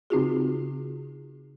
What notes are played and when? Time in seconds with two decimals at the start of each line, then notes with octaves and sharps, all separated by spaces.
0.10 C#3 C4 D#4 F4 F#4 G#4